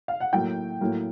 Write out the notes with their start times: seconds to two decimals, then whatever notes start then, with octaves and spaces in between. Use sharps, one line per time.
0.08 F5
0.20 F#5
0.33 A2 F#3 A#3 G5
0.81 A2 F#3 A#3